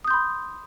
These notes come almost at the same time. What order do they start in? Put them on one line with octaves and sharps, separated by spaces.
D#6 G6 C6 B5